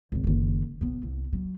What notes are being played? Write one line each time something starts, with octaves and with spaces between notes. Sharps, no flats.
G#1 C3
F#1 D#3
B1 B3
C2
F#3